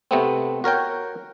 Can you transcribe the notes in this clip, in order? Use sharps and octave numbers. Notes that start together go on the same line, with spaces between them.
C3 A3 B3 C4
F#4 A#4 C#5 G5